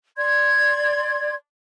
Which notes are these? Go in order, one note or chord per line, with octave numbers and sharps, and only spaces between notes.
D5 C6 G#6